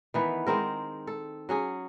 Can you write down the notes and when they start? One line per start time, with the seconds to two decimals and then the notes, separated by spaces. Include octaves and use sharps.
0.14 D#3 E3 B3
0.47 D#3 G#3 C4 A#4
1.07 A4
1.49 F#3 C#4 G#4